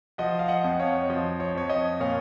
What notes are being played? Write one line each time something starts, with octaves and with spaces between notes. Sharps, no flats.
F3 D#5 F#5
F5
D#5 F#5
F2
C#5 F5
F3 D#5
C#5
F2 C#5
D#5
A#2 C#5 F5